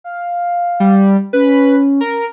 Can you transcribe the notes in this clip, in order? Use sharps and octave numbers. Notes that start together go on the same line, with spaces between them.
F5
G3
C#4 B4
A#4